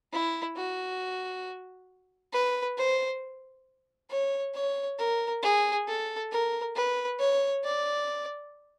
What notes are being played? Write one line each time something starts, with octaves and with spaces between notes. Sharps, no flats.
E4
F#4
B4
C5
C#5
C#5
A#4
G#4
A4
A#4
B4
C#5
D5